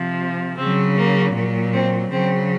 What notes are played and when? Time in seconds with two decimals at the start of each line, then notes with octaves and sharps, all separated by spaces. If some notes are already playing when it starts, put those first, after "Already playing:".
Already playing: C3 F3
0.57 C#3 F#3 C4
0.96 A#3
1.34 A#2 F#3
1.73 C4
2.11 C#3 F#3 C4